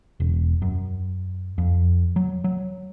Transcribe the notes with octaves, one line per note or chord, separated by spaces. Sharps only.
E1
F#2
F2
F#3
F#3